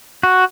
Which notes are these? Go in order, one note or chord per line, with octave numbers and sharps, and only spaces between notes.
F#4